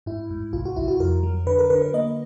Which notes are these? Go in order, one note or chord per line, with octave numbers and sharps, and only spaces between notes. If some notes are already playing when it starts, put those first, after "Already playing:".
G#2 E4
G#2
C2 F4
F#4
C2 E4
F#4
F2 A#4
F#3
D3 B4
A#4
D3 B4
B4
A#3 D#5